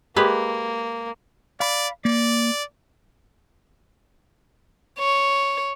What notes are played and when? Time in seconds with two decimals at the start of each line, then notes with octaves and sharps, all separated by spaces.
0.16 G#3 A#3 G4 B4
1.60 D5 F5 B5
2.05 A#3 D5
4.99 C#5